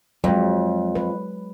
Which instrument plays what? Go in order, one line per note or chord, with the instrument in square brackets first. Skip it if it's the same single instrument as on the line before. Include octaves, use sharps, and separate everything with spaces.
[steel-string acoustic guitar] F2 [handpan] F#3 G#3
[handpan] B4